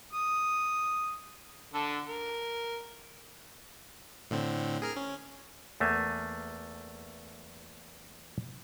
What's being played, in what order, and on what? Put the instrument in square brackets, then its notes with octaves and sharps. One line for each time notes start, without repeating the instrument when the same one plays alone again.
[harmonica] D#6
D3 A4
A#4
[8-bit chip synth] A2 D3 C4
G#4 A#4 F6
C#4
[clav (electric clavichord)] E2 A3 A#3 G#5